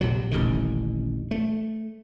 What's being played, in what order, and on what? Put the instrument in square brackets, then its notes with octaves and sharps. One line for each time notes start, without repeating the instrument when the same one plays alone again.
[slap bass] A#1 C3 F#3
D#1 A1 D3 D#3
A3